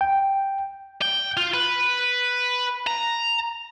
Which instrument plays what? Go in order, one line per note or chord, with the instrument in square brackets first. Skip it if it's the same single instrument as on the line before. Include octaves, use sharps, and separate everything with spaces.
[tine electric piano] G5
[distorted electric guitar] G5
F4
B4
A#5